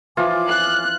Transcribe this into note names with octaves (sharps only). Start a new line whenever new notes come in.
E3 F3 F4 C#5 G#5 D6
F#6